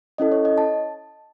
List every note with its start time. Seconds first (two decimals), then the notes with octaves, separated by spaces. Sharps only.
0.18 C#4 E4 A4 D#5
0.32 C#5
0.45 D#5
0.58 A5